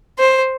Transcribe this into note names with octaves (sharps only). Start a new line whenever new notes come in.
C5